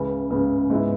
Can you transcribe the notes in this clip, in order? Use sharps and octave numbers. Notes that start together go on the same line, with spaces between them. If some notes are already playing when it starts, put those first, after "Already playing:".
Already playing: C#2 C#3 E3
C#2 C#3 E3
G#2 E3 B3 E4